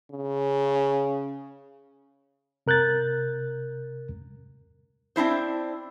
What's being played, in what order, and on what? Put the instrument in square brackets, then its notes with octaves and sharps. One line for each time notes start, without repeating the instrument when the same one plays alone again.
[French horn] C#3
[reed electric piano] C3 A#4 F#6 G6 A6
[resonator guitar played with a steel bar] C4 D4 E4 C5